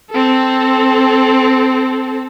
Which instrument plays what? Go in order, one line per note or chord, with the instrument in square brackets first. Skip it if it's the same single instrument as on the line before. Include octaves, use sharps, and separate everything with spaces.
[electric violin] C4 A4